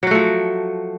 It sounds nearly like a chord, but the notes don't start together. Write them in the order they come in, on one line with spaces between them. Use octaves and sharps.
F#3 F#4 A3 F3